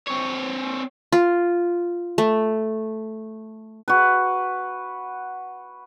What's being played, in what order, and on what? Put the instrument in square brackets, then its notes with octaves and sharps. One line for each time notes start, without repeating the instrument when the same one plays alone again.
[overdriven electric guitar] C4 C#5
[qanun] F4
A3
[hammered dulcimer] F#4 B4